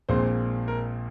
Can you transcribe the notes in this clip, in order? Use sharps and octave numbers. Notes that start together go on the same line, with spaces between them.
A#1 A#2 G#3 C4 C5
A#4